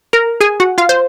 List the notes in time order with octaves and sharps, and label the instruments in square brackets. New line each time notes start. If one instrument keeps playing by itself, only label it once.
[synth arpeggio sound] A#4 A#5
G#4 G#5
F#4 F#5
F4 F5
C5